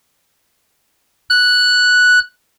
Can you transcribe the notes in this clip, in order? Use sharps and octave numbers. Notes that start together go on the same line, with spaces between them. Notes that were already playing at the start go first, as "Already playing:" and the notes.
F#6